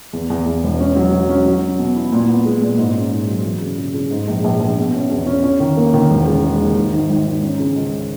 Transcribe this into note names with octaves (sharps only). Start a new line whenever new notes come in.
E2
E2
E2
E1
C#4
F#3
F#3
C#4
F#3
C#4
B2
E4
A#2
B3
G#3
A#2
G#2
C#4
G#2
F#3
E3
C#3
C#3
C#3
G#2
A#1
A#1
A#1
B2
C#4
E2
C#4
C#4
D#3
A#3
D#3
E1
C#3
G#3
D#2
G#1
G#1
G#1
G#1
C#4
C#3
C#2